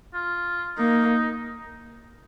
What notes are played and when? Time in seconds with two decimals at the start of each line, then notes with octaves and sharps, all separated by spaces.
0.14 F4
0.77 A#3 D#4